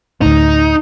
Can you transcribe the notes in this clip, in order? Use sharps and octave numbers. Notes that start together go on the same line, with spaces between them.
D2 A2 D#4